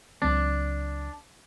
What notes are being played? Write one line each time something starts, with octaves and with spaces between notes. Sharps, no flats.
C#2 F#3 C4 D4